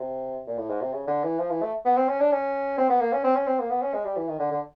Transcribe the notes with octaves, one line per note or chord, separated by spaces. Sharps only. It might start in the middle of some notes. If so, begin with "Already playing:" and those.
Already playing: C3
A#2
A2
G#2
C3
C#3
D3
E3
F3
E3
A3
B3
C4
C#4
D4
C#4
C4
B3
A#3
C#4
C4
C#4
C4
A#3
B3
C#4
G#3
G3
E3
D#3
D3
D3